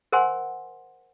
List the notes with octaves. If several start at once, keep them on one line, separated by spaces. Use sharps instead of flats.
A#4 C5 F#5 G#5 C6